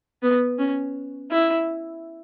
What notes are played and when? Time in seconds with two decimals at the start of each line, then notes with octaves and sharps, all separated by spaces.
0.23 B3
0.59 C#4
1.31 E4